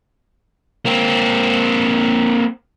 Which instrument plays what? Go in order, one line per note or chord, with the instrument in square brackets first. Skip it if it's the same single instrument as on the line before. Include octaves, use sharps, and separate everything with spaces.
[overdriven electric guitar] A#3 C4